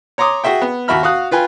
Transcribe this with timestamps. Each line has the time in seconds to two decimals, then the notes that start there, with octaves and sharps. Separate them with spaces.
0.18 C#5 A#5 C6 D6 D#6
0.44 F#4 G#4 E5 G5
0.62 B3
0.88 D#2 F#4 E5 B5 F6
1.03 F#4 F5 D#6 F#6
1.31 F4 B4 G5 G#5